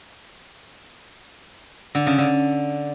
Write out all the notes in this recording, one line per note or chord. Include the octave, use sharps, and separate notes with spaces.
D3
C#3
D3